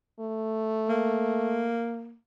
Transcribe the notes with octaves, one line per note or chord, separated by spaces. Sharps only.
A3
A#3